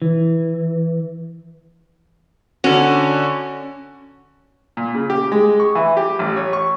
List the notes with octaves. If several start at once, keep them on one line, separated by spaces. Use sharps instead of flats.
E3
D3 C#4 F#4
A#2
C#3
G4
G#3
C#6
E3
G4
A1
C#5
C#6